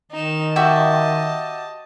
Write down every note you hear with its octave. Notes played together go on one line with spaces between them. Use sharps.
D#3 D#4 E7
F#4 G4 D#5 E5 A5